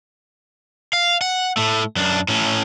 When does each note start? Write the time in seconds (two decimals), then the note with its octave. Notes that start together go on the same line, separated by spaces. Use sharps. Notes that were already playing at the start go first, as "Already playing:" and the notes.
0.93 F5
1.21 F#5
1.57 A2 A3
1.96 F#2 D4
2.28 A2 C#4